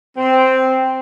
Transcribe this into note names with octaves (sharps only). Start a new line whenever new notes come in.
C4